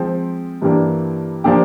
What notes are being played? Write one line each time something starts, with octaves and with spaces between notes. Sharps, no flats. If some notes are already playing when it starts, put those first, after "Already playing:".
Already playing: F3 G#3 C4
G2 E3 G3 A#3 D4
F3 A#3 D4 G4